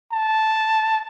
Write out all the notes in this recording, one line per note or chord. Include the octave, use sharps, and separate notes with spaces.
A5